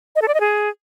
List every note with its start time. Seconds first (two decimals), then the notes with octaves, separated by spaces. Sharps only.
0.16 D#5
0.22 A4
0.28 D5
0.34 D#5
0.40 G#4